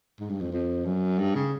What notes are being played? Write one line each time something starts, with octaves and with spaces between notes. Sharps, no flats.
G#2
G2
F2
F2
F#2
G2
C#3